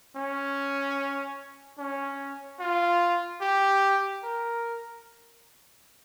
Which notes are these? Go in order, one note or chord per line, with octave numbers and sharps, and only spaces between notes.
C#4
C#4
F4
G4
A#4